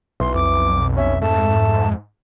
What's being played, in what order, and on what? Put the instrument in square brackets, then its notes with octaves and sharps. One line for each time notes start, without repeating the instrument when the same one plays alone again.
[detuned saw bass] B1 [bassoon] E3 [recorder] C6
[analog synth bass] F2 [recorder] D6
[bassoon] C#4 [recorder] E5
[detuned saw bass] G#2 [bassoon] A3 [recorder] A5